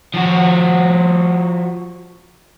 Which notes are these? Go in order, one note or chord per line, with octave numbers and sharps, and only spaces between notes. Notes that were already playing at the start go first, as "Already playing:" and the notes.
F3 F#4